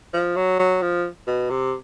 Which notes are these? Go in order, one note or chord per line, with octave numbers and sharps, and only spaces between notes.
F3
F#3
F#3
F3
B2
C3